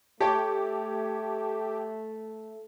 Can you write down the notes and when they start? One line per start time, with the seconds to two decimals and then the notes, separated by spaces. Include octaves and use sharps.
0.21 A3 G4 C#5 A5